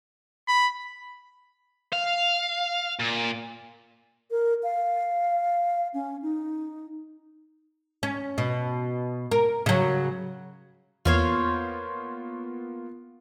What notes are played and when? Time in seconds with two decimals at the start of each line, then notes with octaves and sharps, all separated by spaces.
0.48 B5
1.93 F5
2.99 A#2
4.31 A#4
4.63 F5
5.94 C#4
6.22 D#4
8.03 C#4
8.38 B2
9.31 A#4
9.66 C#3 F#3
11.05 E2 A#3 B3 F4 C5 C#5 F5